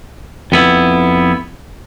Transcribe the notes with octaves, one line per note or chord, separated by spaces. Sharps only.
F2 B3 E4